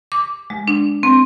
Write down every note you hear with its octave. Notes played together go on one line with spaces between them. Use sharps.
D6
G#3
D4
C4